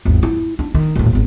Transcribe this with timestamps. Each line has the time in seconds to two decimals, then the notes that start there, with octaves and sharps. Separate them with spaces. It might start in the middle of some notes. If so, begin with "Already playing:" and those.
0.05 G#1 E2
0.23 E4
0.59 D4
0.74 D#3
0.96 D#1 A2
1.12 G#1 B3